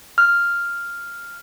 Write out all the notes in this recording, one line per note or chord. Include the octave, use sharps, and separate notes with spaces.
F6